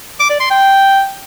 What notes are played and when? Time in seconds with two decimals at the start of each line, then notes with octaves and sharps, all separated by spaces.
0.20 D6
0.30 D5
0.40 C6
0.50 G5